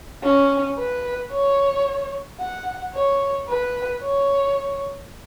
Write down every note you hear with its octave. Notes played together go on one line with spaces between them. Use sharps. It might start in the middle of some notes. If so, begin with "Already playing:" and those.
C#4
B4
C#5
F#5
C#5
B4
C#5